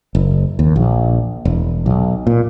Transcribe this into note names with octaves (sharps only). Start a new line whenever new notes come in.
F#1
D#2
A#1
E1
B1
A#2